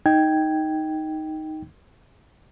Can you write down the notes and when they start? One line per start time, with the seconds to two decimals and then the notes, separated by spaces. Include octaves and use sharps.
0.06 D#4 G5 G#6